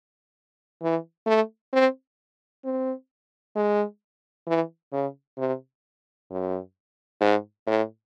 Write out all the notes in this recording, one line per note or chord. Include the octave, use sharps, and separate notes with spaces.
E3
A3
C4
C4
G#3
E3
C#3
C3
F#2
G#2
A2